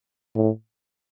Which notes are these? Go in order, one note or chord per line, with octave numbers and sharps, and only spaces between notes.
A2